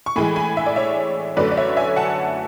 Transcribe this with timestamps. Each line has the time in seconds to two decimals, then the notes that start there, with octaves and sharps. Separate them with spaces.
0.06 C#6
0.16 A2 E3 G#3 G#5 B5
0.36 G#5 B5
0.57 E5
0.66 D5
0.76 C#5 E5
1.37 F#2 D3 A3 B4 D5
1.52 D5
1.57 C#5 E5
1.77 E5 G#5
1.96 F#5 A5